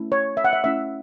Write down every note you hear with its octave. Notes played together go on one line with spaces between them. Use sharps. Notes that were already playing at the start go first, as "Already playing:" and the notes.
Already playing: A3 C#4 E4
C#5
E5
F#5
E5
A3 C#4 E4 E5